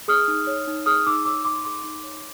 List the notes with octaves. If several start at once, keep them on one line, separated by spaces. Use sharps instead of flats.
G#4 D#6 F6
D#4
C#5
D#4
G#4 D#6 F6
D#4 D6 E6
C#5 D6 E6
D#4 C6 D6
G#4 C6 D6
D#4
C#5